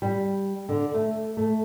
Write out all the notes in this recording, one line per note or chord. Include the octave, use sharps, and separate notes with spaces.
G3
D3
A3
A3